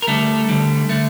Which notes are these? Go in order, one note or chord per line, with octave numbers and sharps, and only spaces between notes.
A#4
D2 D3 G3 A3 A4
D2 D3 G3
D3 A3